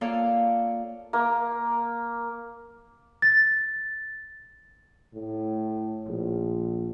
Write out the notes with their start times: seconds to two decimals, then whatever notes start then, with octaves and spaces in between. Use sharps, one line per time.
0.01 A#3 F4 A4 C#5 D5 F5
1.13 A#3
3.22 A6
5.14 A2
6.08 A#1